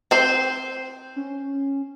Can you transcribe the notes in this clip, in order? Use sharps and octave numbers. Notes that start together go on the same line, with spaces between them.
C4 C5
C#4